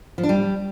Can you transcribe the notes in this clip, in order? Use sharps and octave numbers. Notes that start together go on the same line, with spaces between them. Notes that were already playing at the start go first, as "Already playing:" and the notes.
F3
D4
G3